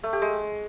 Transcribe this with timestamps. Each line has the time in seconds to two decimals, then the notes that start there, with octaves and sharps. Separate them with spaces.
0.04 A3
0.13 G4
0.22 G#3